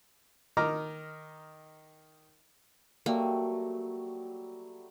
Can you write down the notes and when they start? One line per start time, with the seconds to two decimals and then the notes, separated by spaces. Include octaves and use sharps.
0.57 D#3 D#5 A#5 D6 F6
3.06 F#3 G3 A3 A#3